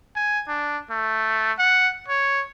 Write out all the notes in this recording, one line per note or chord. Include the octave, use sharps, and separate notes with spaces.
G#5
D4
A3
F#5
C#5